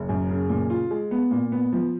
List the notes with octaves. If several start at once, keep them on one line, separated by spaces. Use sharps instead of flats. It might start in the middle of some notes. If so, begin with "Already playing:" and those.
Already playing: F#1
F#2
C#3
A#2
F4
G#3
B3
A#2
B3
F3